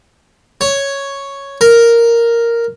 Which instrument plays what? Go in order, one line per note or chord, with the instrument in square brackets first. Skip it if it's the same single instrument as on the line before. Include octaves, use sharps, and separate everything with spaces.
[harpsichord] C#5
A#4